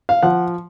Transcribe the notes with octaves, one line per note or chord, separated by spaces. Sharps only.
F5
F3 F#5